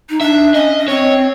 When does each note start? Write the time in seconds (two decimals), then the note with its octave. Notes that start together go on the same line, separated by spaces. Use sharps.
0.09 D#4
0.21 D4 E5
0.54 C#4 D#5
0.79 C#4
0.88 C4 C#5